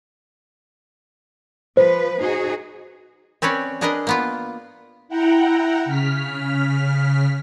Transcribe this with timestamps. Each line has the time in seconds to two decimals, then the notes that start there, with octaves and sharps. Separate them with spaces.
1.77 F3 B4 C5
2.21 D#4 F#4 G#4
3.42 C4 C#4 B4 C#5 D5
3.81 D4 G#4 A#4 B4 D#5 G#5
4.07 A#3 B3 F4
5.08 E4 F#5 G5 A#5
5.85 C#3 F6 B6